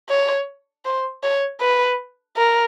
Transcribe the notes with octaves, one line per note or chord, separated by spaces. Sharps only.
C#5
C5
C#5
B4
A#4